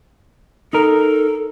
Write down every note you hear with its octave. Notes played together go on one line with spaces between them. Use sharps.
D#4 A4 A#4